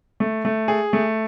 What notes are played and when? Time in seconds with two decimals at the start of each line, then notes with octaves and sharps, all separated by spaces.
0.20 A3
0.45 A3
0.68 G#4
0.93 A3